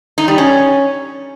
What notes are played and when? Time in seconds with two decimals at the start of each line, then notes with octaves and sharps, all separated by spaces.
0.18 D#4
0.28 G3
0.38 C#4